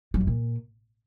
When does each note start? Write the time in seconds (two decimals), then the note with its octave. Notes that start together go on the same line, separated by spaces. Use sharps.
0.14 F#3
0.21 F#2
0.27 A#2